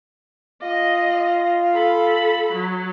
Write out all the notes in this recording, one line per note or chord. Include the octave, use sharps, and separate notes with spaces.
F4 D#5
A4 B5
F#3